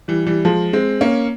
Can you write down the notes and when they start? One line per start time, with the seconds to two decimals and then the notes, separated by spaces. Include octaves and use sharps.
0.08 E3 G3
0.26 E3 G3
0.45 F3 G#3
0.73 G#3 C4
1.01 A#3 C#4